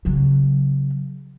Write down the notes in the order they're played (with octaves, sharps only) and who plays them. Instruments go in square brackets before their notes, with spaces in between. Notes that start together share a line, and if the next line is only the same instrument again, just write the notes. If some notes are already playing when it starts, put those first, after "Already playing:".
[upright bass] C#3 F#3